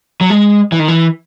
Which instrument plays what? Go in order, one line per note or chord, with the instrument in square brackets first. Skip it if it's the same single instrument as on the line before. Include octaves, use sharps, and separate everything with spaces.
[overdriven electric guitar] F#3
G#3
E3
D#3
E3